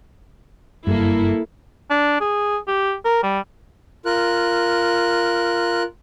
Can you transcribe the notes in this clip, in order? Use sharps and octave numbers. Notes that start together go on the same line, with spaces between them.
F#1 G2 A#3 E4 A4
D4
G#4
G4
A#4
G3
F4 A#4 F#6